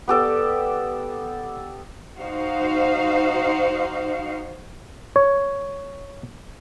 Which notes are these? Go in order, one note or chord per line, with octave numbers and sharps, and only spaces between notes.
B3 G4 A4 D5
D#4 F#4 C5 F5
C#5